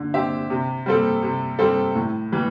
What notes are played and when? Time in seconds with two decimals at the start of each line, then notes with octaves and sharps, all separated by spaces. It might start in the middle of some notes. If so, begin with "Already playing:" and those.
Already playing: D3
0.14 C4 G4 E5
0.50 C3
0.86 G3 C4 A4
1.22 C3
1.59 G3 C4 A4
1.95 A2
2.32 E3 G3